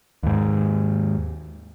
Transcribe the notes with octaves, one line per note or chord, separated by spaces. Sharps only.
D#2 G#2